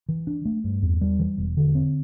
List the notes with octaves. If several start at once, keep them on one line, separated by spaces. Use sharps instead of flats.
E3
D4
A3
G2
E2
G3
E3
E1
D3
C4